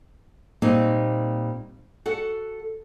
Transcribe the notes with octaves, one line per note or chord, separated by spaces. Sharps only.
A#2 G3 A#3 C4 D#4
F#4 A4 F#5